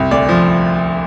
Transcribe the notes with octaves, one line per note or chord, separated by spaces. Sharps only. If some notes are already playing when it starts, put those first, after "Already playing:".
Already playing: C2
D2 D5
F3